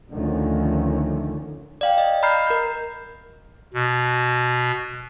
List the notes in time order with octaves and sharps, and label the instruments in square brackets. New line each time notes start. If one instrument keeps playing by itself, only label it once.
[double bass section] D2 D3 D#3 F3 A3 C#4
[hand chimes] D5 F5 G5
D#5
D#5 A#5 B5 F6 G6 C7
A#4 G6
[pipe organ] B2